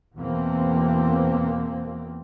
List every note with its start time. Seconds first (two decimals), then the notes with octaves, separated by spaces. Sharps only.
0.16 E2 B2 E3 A#3 C4